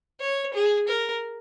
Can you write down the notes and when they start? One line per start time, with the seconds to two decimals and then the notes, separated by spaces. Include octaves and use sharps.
0.20 C#5
0.54 G#4
0.88 A#4